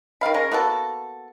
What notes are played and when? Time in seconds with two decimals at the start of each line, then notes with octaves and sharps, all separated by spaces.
0.21 D#3 C4 F5 B5
0.34 G#3 C#4 A#4
0.51 A#3 B3 F#4 A4